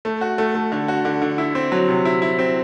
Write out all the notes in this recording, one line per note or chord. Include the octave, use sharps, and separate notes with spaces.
A3
F#4
A3
A3
D3
F#4
D3
D3
E4
C4
F#3
C3
E4
E4
C4